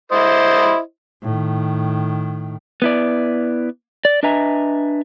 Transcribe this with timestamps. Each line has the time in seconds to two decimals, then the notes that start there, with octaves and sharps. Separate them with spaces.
0.12 E4 C5 D#5
1.23 A2 D#3
2.82 B3 E4 D5
4.05 D5
4.23 D4 B4 D#5 E5 G#5 A#5